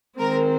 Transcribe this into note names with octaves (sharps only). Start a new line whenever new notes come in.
D#3 G#3 C4 A#4